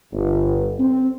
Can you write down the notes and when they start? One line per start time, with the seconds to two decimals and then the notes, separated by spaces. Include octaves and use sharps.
0.12 G1
0.78 C4